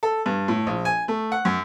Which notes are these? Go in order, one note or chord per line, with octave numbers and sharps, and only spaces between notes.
A4
G2
A2
A#1
G#5
A3
F#5
F#2